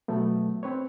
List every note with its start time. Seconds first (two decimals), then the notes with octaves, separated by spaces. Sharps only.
0.08 B2 F#3 A3 B3
0.63 C4 B4 C#5